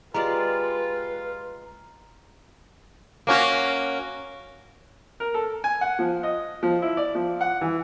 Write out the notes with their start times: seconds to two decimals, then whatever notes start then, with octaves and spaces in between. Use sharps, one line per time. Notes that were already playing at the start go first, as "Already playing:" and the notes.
0.14 G#3 F4 G4 B4 D5 A#5
3.27 A#3 C#4 F#4
5.20 A#4
5.34 A4
5.64 G#5
5.81 F#5
5.99 F3
6.23 D#5
6.63 F3
6.82 E4
6.97 D5
7.15 F3
7.41 F#5
7.61 E3